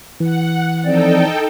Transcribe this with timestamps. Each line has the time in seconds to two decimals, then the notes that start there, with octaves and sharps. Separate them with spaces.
0.20 E3 F#5
0.85 F3 C4 D#4 A4 D5 G5